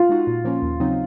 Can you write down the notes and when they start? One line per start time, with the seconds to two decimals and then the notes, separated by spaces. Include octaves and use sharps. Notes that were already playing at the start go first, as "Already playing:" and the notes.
Already playing: F4
0.09 G#3 D#4 F#4
0.27 A#2
0.45 F3 A#3 C#4
0.62 D#2
0.80 C#3 F#3 C4 D#4